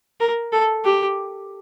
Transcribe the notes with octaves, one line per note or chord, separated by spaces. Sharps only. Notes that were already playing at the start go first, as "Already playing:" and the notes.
A#4
A4
G4